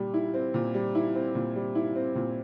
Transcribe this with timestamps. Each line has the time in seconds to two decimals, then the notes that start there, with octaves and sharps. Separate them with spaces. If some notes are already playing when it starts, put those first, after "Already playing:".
Already playing: A#2 G3
0.14 E4
0.34 C4
0.54 A#2
0.74 G3
0.95 E4
1.15 C4
1.35 A#2
1.56 G3
1.75 E4
1.96 C4
2.15 A#2